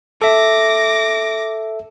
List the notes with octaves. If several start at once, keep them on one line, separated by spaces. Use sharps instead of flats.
A4 E5 D6 A#6